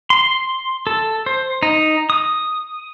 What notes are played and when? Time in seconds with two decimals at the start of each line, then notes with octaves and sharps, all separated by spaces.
0.10 C6
0.87 A4
1.26 C5
1.63 D#4
2.10 D#6